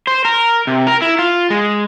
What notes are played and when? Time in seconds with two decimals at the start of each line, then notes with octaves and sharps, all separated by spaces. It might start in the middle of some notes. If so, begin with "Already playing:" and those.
0.07 C5
0.25 A#4
0.67 C3
0.87 A#4
1.02 E4
1.19 F4
1.50 G#3